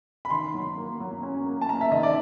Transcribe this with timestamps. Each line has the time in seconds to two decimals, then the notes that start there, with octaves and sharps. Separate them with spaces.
0.25 B5
0.30 D#3 C6
0.54 F#3
0.77 A#3
1.00 F#3
1.23 C#4
1.46 A#3
1.61 A5
1.69 A#3 A#5
1.81 E5
1.92 D#3 D#5
2.03 D5